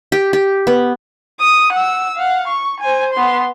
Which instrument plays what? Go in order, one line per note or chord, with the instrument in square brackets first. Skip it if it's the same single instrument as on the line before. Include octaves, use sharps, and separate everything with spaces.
[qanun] G4
G4
B3
[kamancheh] D#6
F#5 E6
F5 F#5
C#6
C5 G#5
B3 C6